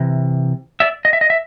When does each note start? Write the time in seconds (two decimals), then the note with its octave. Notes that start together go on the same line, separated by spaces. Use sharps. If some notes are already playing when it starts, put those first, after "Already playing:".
Already playing: C3 E3
0.80 D5 E5
1.05 D#5
1.13 E5
1.21 D#5
1.30 E5